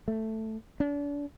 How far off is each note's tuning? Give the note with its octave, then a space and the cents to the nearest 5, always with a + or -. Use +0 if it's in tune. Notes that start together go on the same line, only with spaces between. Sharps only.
A3 +5
D4 -35